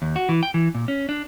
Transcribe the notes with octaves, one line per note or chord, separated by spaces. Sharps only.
D#2
F#4
E3
G5
E3
A#2
C#4
D4